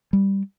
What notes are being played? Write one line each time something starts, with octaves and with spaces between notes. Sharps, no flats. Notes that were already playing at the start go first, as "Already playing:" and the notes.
G3